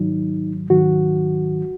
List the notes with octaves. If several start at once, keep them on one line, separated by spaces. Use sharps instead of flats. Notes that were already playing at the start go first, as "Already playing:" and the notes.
Already playing: G#2 D#3 F#3 D#4
G#2 D#3 F#3 F#4